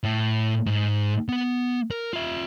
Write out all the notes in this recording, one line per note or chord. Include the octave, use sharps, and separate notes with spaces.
A2
G#2
B3 F#5
A#4
F4 E5